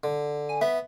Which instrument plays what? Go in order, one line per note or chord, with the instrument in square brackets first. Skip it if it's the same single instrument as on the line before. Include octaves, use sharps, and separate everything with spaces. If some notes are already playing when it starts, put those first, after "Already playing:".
[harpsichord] D3
[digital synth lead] G#5
[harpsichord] B3 [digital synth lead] E5